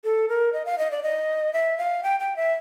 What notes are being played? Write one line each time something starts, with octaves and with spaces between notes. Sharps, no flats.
A4
A#4
D#5
F5
D#5
D5
D#5
E5
F5
G5
G5
E5